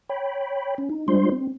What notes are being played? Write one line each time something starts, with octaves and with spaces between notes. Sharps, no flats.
C#5 G5 B5
C#4
D#4
G3 G#3 D4 F4 C5 C6
C4